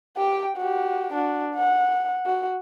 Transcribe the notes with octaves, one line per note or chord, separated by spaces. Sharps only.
G4 G5
F#4 G4
D4 F#4
F#5
F#4